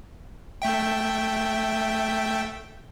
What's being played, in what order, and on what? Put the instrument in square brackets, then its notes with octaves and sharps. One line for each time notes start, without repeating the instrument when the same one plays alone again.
[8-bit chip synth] A3 E5 G5